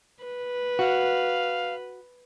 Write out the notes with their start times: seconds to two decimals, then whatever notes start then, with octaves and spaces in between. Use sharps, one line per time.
0.23 B4
0.79 F#4 F5